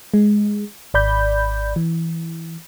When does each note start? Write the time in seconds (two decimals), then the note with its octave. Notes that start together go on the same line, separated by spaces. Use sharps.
0.14 G#3
0.94 G#1 D5 B5 G6
1.76 E3